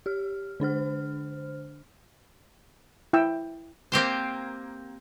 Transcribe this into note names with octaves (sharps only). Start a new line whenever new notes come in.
G4 F6
D3 D4 C5 F6
E4 G5 E6
A#3 C4 G4 C5